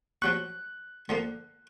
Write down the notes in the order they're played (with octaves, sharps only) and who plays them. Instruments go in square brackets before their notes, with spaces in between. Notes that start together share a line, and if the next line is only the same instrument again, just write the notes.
[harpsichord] F3 F#3 C#6 [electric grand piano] F#6
[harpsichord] D3 F3 A#3